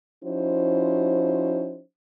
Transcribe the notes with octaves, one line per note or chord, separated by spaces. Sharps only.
F3 C#4 D#4 E4 F#4 C5